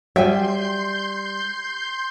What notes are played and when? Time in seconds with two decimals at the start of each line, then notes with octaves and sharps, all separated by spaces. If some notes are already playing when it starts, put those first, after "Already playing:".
0.16 F#3 G3 E5 G5 G#5 C6 G6